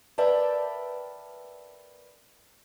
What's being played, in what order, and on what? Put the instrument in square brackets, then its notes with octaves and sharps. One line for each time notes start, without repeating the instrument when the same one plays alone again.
[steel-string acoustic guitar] A#4 B4 D5 E5 G5 A5